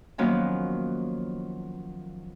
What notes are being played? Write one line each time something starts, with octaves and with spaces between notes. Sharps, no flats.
D#3 F3 F#3 A#3 B3 C#4